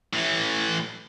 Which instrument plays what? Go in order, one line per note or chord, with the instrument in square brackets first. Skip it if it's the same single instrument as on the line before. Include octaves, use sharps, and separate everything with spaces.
[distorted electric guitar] A2 E3